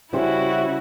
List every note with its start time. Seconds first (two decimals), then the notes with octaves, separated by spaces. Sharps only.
0.13 C#3 G3 E4 F#4 C5